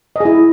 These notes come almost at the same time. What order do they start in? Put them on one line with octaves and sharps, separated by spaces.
D#5 G#4 E4